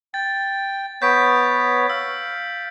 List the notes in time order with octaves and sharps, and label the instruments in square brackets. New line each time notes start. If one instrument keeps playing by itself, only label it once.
[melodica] G5 [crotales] A6
[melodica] B3 C#5 [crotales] G6 B6 D7
[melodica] F5 [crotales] E6